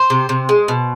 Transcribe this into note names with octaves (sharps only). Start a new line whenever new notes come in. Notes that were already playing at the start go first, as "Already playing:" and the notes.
Already playing: C5
C3
C3
G#3
B2